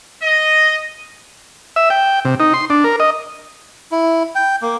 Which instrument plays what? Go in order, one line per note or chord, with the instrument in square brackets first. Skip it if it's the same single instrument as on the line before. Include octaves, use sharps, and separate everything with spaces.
[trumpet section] D#5
[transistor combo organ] E5
G5
C3
D#4
C6
D4
A#4
D#5
[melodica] E4
G5
A#3